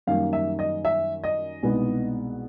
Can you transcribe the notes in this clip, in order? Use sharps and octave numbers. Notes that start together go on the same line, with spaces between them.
F#2 D#3 G3 A#3 F5
E5
D#5
E5
D#5
C2 B2 G#3 B3 D#4